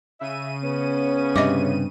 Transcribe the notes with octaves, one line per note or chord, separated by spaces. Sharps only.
C#3 E5 D#7
B3 C#4
G2 C3 D#5 E5 D6